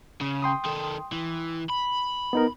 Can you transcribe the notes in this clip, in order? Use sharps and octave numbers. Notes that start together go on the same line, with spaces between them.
C#3
G5 C6 D#6
D#3 A4
E3
B5
B3 D#4 A#4